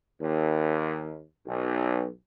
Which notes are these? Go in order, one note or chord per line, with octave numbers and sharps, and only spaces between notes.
D#2
B1